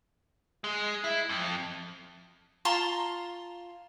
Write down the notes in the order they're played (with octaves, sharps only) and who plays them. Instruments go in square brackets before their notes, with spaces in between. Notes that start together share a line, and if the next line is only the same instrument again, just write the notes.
[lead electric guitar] G#3
E4
F2
[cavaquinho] F4 A5 A#5 C6